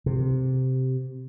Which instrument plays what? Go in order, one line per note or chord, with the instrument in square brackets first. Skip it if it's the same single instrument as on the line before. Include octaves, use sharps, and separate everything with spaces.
[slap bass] C3